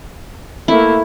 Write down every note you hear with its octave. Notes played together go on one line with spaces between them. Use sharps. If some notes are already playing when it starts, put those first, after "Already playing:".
A3 A#3 E4